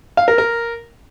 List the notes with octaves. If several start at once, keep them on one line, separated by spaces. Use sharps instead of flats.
F5
A#4
A#4